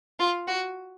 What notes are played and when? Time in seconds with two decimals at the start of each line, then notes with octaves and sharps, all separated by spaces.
0.20 F4
0.48 F#4